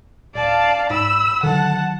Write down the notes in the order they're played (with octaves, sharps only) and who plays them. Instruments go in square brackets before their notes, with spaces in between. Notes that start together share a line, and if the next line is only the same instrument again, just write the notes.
[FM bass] D1 [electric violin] D5 F5 [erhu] A5
[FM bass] G#2 [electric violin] B5 [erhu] E6
[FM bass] D3 [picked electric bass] D#3 F#3 [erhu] F#5 [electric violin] A5